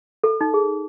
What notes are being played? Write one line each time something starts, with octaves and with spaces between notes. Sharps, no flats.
A4
D#4
G#4